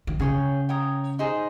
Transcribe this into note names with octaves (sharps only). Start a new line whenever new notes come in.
D#3
C#3 G#4 C#5 G5
C#5 G5 A#5 D#6
D#4 G#4 C5